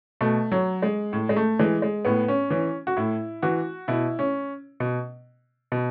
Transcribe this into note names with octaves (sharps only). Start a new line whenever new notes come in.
B2 A3
F#3
G#3
A2
G#3
A3
E3 G#3
G#3
A2 B3
C#4
E3 C#4
F#4
A2 E4
E3 F#4
B2 E4
C#4
B2
B2